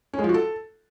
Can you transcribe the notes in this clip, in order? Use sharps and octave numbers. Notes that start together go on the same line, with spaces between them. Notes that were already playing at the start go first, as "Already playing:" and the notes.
C#4
G#3
F3
F#4
A4